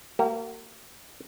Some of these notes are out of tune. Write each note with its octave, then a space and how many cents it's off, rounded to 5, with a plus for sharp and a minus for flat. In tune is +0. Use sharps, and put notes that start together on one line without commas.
A#3 -30 F#4 +45